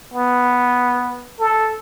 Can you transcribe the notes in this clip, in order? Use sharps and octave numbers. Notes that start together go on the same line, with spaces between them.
B3
A4